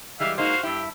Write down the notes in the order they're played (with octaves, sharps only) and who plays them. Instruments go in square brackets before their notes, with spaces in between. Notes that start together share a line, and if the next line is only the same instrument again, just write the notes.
[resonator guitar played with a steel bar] E3 G3 G#3 [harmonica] E5 F5
[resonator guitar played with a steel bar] G#3 A#3 D#4 [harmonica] F#4 C5 F5
[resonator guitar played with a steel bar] G2 E4 [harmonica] G4